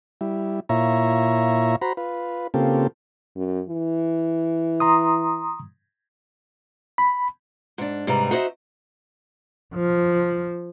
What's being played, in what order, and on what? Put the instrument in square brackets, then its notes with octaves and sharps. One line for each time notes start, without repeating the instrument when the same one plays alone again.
[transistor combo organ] G3 E4
A#2 E4 F4 C#5 E5 A#5
F#4 C5 A#5 B5
F4 B4
C#3 A#3 C4 F4 G4 A4
[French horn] F#2
E3
[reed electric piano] A#5 C6 D#6
B5
[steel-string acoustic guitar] G#2 D4
G#2 C3 G3 B4 A#5
D#4 F#4 C5 D#5 E5
[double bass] F3